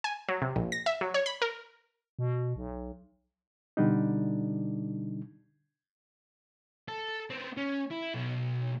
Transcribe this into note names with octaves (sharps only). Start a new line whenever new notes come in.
G#5
F#3
C3
A#1
A#6
E5
F#3
C#5
B5
A#4
B2
B1
B2 D3 G3 D4 D#4
A4 A5
B3 C4
C#4
E4
B2 F#3